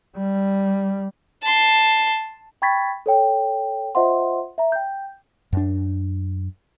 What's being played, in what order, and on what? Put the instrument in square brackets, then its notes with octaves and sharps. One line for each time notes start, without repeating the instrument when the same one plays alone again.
[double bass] G3
[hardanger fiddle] A5 C6
[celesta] G5 B5 C#6 G#6 A6 B6
A4 C#5 G5
F4 C5 D#5 E5 F#5 C6
E5 A#5
G5 G6
[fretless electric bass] F#2 D4